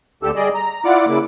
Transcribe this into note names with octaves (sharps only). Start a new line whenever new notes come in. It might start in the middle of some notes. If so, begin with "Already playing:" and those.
D2 D3 G4 A4 E6
G3 G#4 D5 D#5
A#5
E4 F4 D5 F#5 D6
C#3 A#3 E4 D6